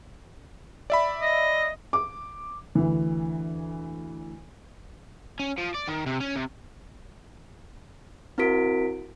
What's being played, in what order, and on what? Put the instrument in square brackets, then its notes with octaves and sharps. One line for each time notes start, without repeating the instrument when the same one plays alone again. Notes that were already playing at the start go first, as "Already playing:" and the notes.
[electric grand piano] D5 E5 B5
[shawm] D#5
[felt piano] D6
[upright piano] D2 E3
[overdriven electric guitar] C#4
F3
D5
D#3
C3
C#4
C3
[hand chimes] C4 E4 F#4 A#4 B6 D7